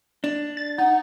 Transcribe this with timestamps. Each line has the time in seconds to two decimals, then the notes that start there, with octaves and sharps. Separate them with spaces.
0.24 D4
0.57 A6
0.78 D#4 F#5